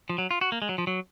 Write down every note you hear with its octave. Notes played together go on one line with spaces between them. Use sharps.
F3
F#3
F4
F#4
A#3
G#3
F#3
F3
F#3